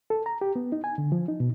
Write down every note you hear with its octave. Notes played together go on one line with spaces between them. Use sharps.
A4
A#5
G4
B3
D#4
G#5
D3
F3
D#4
B2